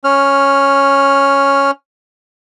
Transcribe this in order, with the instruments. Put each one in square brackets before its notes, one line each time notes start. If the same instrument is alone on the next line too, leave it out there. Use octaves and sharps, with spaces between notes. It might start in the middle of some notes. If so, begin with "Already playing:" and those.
[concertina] C#4 F6